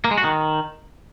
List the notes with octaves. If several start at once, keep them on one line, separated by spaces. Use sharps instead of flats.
A#3
G#3
F#4
D#3